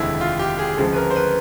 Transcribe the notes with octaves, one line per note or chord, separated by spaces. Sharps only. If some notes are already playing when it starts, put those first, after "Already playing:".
Already playing: F1 D#2 D3 F3 G#3 E4
F4
G4
G#4
D2 C#3 F3 G#3 A4
B4
A#4
C5
B4